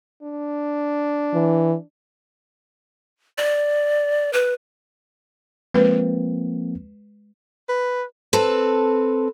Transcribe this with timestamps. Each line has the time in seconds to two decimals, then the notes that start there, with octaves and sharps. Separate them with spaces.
0.23 D4
1.34 E3
3.38 D5
4.33 B4
5.74 F3 G#3 A#3 C4 B4
7.69 B4
8.33 C4 A4 B4